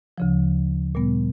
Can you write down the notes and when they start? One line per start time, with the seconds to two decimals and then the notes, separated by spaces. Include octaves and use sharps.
0.18 D2 C#3 F3
0.95 A#2 G3 B3